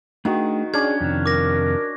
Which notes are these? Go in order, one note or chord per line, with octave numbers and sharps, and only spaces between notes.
D#3 A3 D4 F#4 G#4
C#4 D4 G#4 G#6
F2 C3 D#3
A#4 D6 A#6